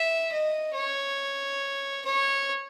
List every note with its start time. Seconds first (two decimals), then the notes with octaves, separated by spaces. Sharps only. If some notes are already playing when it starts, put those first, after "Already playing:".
Already playing: E5
0.32 D#5
0.74 C#5
2.05 C#5